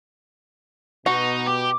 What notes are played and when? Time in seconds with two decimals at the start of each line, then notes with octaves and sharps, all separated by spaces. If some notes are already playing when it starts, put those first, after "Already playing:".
1.06 B2 D#4 F#4
1.46 G4 D6